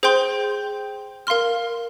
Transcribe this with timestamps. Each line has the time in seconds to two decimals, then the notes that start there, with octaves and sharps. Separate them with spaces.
0.03 G#4 C5 G5 C6 G6
1.27 A#4 F5 C6 F6